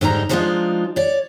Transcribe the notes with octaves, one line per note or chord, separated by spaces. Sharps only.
G#2 D3 G3 D#4 B4 A#5
F3 G3 G#3 D4 D#4 F4
C#5 D5